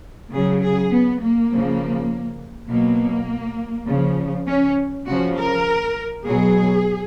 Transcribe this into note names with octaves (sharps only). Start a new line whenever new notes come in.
C#3 F#3 G#4
G#4
B3
A#3
C#3 F3
B2 F#3 A#3
C#3 F3
C#4
C#3 F3 F#4
A#4
B2 F#3 G#4